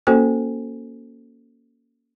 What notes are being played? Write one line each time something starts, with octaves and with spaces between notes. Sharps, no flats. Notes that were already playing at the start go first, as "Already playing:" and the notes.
A#3 C#4 F#4 A4 C5 G#5